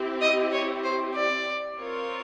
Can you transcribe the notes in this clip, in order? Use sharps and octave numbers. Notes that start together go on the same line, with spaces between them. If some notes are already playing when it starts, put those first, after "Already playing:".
Already playing: C4 E4 G4
D#5
C#5
C5
D5
C4 F4 A#4 C#5